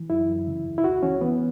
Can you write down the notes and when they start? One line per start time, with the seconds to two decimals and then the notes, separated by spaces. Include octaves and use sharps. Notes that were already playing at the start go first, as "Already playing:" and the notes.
Already playing: E3
0.10 F#2 E4
0.29 F#2
0.47 C#3
0.66 E2
0.78 E4
0.84 C#2 F#4
1.03 E3 C#4
1.21 E3 B3